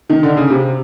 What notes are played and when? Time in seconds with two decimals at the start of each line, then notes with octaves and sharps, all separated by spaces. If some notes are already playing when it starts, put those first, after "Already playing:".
0.10 D#3
0.23 D3
0.37 C#3
0.50 C3